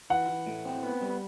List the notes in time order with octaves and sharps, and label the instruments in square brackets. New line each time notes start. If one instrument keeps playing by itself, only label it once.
[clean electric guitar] E3 [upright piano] F#5
[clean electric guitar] E3
A2
C4
B3
G3